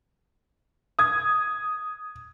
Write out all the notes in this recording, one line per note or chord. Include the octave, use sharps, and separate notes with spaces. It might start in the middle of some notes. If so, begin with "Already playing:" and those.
D#6 G#6